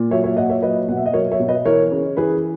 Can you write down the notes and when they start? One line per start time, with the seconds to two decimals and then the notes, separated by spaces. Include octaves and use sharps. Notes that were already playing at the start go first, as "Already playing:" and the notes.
Already playing: A#2
0.11 F#3 C#5 E5
0.24 C#5 E5
0.37 A#2 D#5 F#5
0.49 C#5 E5
0.62 F#3 B4 D#5
0.88 B2 F#5
0.97 E5
1.06 D#5
1.13 F#3 A#4 C#5
1.31 C#5 E5
1.40 B2
1.48 B4 D#5
1.65 E3 A#4 C#5
1.92 C#3
2.17 E3 G#4 B4